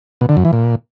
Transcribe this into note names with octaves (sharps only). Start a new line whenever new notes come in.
B2
D3
F#2
E3
A#2